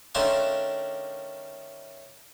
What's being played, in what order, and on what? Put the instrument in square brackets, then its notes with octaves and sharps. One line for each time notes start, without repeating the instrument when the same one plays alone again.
[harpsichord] D#3 A3 C#4 D4 F5 C6